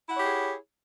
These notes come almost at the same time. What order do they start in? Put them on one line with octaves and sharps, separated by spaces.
E4 F#5 C#5 G4 G#4